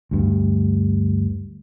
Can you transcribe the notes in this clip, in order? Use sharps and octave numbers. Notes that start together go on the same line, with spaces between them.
D2 G2